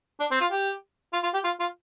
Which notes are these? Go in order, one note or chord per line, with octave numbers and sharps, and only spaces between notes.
D4
C4
F4
G4
F4
F4
G4
F4
F4